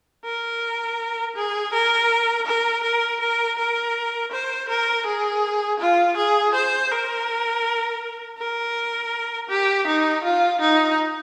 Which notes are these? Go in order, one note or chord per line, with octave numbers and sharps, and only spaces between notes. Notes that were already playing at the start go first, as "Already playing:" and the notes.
A#4
G#4
A#4
A#4
A#4
A#4
A#4
C5
A#4
G#4
F4
G#4
C5
A#4
A#4
G4
D#4
F4
D#4